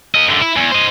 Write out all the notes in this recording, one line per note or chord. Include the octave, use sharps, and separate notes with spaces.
A#3 D#5
F#2 D3
E4
E2
C5 D#5